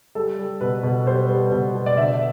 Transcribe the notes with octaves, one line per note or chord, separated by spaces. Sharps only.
G3 A4
G3
B2 B4
B2
G3 C5
G3
B2
B2
D5
D3 E5